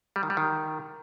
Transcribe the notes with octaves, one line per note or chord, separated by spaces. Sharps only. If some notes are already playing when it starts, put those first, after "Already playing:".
G3
D#3
G3
D#3